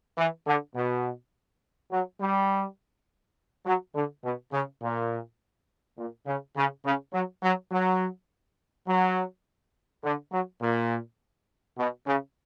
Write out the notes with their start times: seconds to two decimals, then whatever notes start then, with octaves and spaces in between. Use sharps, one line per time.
0.18 E3
0.47 D3
0.76 B2
1.92 F#3
2.21 G3
3.66 F#3
3.95 D3
4.24 B2
4.53 C#3
4.82 A#2
5.98 A#2
6.26 C#3
6.56 C#3
6.85 C#3
7.13 F#3
7.43 F#3
7.72 F#3
8.88 F#3
10.04 D3
10.32 F#3
10.62 A#2
11.78 B2
12.07 C#3